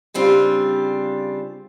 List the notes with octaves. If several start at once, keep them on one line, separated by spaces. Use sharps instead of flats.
C#3 G3 C4 D4 F4